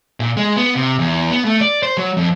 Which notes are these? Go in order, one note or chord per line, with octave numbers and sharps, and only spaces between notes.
A#2
G#3
B3
C3
E2
B3
A3
D5
C5
F#3
F2